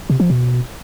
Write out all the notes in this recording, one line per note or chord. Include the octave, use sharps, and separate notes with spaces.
C3
F3
B2